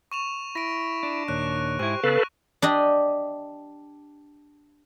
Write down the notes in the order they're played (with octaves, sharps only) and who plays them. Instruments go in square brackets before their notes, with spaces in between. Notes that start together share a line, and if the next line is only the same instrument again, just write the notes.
[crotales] C#6 E7 F7
[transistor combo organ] E4 B5 [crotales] A#6 D7
[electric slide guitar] D4
[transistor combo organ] D#2 A#2 C#5 [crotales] F#6
[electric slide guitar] G#2 E4 [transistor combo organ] G4 C5 [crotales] C#6
[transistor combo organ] C#3 B3 [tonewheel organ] A4 B4 [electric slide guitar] F5
[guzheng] D4 G4 D#5